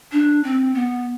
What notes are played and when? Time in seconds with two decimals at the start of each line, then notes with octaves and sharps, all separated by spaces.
0.12 D4
0.44 C4
0.75 B3